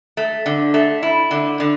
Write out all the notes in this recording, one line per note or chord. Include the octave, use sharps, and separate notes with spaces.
A3
D3
A3
E4
D3
D3